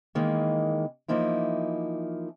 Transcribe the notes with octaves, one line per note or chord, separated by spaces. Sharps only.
D#3 E3 G#3 A#3
E3 F3 A#3 D#4 E4